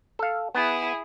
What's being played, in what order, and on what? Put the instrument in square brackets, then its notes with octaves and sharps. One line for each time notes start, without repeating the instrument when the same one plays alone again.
[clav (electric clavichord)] A4 F5
[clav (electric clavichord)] B3 [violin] E4 G#4